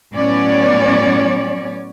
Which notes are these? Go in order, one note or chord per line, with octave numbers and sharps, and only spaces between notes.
A2 F#3 B3 C#4 C#5 D5